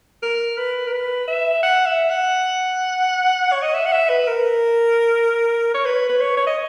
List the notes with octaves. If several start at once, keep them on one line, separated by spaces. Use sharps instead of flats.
A#4
B4
A#4
B4
E5
F#5
E5
F#5
C#5
D#5
E5
F#5
E5
B4
A#4
C#5
B4
B4
C#5
C#5
D#5